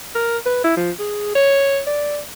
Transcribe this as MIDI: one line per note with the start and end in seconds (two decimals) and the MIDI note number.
0.15 0.38 70
0.46 0.63 71
0.64 0.74 64
0.77 0.91 53
0.99 1.31 68
1.35 1.81 73
1.87 2.20 74